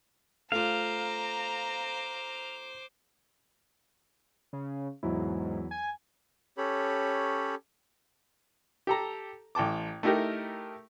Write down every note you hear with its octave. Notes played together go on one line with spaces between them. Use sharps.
A3 F4 C5 F5 A#5 D6
C#3
E2 G#2 F#3 E4
G#5
C#4 G4 A4 C#5 B5
G4 A4 A#5
A1 G5 A5 D6
A3 D#4 E4 G4 A#4